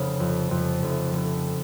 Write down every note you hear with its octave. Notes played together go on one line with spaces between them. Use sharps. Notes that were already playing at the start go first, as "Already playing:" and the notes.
Already playing: F1 C#3
F2
F2
F1
F1